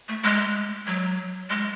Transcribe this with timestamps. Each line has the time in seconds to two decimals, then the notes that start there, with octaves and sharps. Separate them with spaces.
0.08 A3
0.24 G#3
0.87 F#3
1.50 G#3